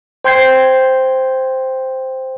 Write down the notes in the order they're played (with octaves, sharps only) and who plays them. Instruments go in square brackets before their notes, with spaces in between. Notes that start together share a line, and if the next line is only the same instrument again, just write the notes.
[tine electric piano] C5 G5 C6 G6 G#6 C7